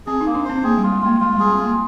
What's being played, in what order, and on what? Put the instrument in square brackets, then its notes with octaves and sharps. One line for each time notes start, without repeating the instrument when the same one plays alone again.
[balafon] C4 [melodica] G#4
[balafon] D#4
[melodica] A#3
[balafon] D4
[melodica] C5
[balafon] C4
[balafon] A#3 [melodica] G#4
[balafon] G3
[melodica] F4
[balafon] G#3
[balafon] A#3 [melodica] F4
[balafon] G#3 [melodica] F4
[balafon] G3
[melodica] G#4
[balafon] C4
[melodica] F4
[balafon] A#3